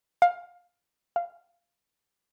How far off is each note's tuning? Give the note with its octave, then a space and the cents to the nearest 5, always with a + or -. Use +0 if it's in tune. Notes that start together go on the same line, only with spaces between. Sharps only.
F5 +15
F5 -15